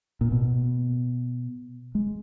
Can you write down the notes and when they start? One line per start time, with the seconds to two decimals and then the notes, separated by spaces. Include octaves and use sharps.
0.21 A#2
0.32 B2
1.95 G#3